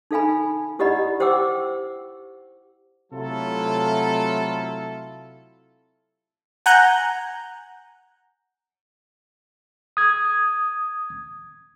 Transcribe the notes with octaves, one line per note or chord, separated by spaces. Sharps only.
D#4 A4 F5 G#5 B5
E4 G4 D5 D#5 F#5 B5
G4 C5 F#5 G5 D6 E6
C3 F#3 A3 E4 F4 A4
F#5 G#5 A#5 F#6 G6
D#6 G#6